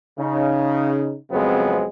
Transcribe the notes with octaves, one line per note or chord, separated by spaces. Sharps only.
C#3 D#4
F2 C#3 F#3 G#3 B3 C4